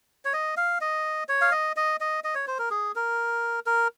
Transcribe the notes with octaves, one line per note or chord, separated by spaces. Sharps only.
C#5
D#5
F5
D#5
C#5
F5
D#5
D#5
D#5
D#5
C#5
C5
A#4
G#4
A#4
A#4